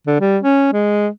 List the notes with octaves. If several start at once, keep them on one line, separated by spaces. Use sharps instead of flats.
D3
G3
C#4
G#3